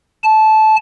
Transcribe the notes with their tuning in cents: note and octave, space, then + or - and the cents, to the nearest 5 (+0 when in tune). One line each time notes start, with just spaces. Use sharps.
A5 -15